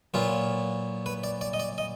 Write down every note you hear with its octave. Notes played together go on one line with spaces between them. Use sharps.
A#2 F#3 B3 F4
B4
D5
D5
D#5
D5
D#5